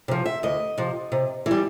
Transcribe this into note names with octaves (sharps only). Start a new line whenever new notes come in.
C3 F3
E5
D2 D#5
C3 F3
C3
E3 G3